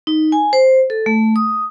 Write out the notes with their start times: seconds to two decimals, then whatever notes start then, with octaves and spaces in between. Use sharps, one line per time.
0.07 D#4
0.32 G#5
0.53 C5
0.90 A4
1.06 A3
1.36 D#6